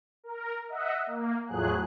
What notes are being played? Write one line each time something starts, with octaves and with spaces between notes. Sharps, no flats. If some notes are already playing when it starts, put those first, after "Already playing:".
A#4
D#5 E5 F#5
A#3
E2 A2 F3 F#3 G#4 F#6